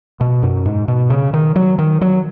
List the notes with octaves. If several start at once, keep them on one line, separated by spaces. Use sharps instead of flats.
B2
F#2
G#2
B2
C#3
D#3
F#3
D#3
F#3